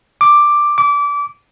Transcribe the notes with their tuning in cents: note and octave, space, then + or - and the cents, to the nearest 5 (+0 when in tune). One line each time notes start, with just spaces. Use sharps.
D6 +5
D6 -25